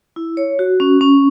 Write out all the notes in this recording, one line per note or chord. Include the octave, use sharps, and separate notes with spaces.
E4
C#5
F#4
C#4
C#4